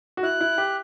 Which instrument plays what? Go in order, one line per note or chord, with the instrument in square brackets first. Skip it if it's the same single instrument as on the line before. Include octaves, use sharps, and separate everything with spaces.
[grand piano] F#4
[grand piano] E4 [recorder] F#6
[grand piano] E4
G4